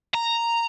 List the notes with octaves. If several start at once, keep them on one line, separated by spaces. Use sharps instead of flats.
A#5